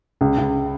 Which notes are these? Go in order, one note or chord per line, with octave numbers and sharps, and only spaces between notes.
C#2
C#2